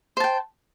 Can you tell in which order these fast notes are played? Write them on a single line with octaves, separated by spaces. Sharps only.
C5 A5 G5